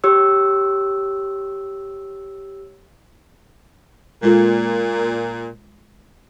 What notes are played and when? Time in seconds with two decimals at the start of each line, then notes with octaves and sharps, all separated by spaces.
0.04 G4 C#5 E6
4.23 A#2 G#3 F4 A4